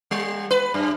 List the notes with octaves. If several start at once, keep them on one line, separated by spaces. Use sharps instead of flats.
G3
B4
F#2